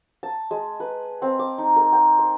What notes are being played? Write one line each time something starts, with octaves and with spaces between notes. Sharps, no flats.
A5
G#3
B4
C4
D6
D#4
A#4
G5
C6